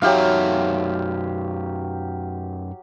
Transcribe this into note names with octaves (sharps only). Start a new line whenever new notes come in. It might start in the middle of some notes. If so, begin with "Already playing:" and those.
F#2 F#3 D#4 G4 E5 F5